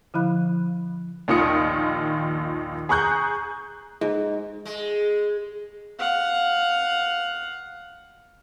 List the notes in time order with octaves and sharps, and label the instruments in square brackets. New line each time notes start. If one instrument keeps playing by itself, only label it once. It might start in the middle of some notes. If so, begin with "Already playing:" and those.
[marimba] D3 F3 E4 F5 B5 F#6
[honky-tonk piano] A#1 D#2 D#3 F4 D#6 C#7
G#4 A#5 C#6 F#6 G6
[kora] G#2
[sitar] G#3
[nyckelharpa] F5 F#5